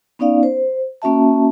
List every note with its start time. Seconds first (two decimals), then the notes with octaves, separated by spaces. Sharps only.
0.19 B3 C#4 D#4 D5 F5
0.43 C5
1.02 A#3 C#4 F#4 E5 A5